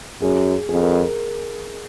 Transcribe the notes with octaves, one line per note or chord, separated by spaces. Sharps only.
F#2 G#4
F2 G#4
A#4